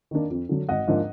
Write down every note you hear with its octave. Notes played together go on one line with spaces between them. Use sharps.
D#3 A#3 D4
F2
D3 F#3
G#1 D#5 F#5
G#2 F3 A#3 D4